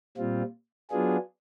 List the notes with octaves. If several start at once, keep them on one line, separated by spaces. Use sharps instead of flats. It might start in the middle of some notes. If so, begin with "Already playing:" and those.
A#2 G3 C4 F4
F#3 B3 D4 F4 G#4